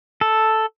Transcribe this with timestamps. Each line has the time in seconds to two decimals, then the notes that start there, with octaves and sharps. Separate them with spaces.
0.21 A4